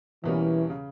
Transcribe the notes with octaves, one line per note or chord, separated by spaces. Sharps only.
E2 B2 E3 G3 A#3 C#4
C#3